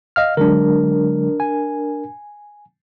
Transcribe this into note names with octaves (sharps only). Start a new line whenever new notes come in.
D#5 F5 F6
D3 F#3 G#3 D4 A#4
G#5